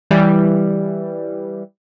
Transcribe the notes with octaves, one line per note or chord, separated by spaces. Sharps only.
E3 G3